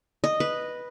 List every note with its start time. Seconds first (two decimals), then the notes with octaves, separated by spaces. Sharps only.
0.24 D#5
0.40 B4